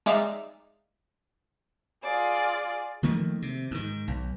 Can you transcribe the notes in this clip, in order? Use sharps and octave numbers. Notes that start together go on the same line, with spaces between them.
G#3 D#4 D5 E5 F5
F4 G#4 D5
D#3 F3 A3 A#3
C3
G#2 D#3
B1